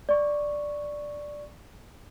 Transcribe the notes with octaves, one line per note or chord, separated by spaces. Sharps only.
D5 C#6